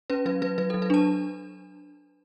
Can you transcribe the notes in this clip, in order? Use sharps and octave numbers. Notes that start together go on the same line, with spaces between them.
C#4 B4
F#3 B4
F#3 B4
F#3 B4
F#3 A4
B4
D4 A5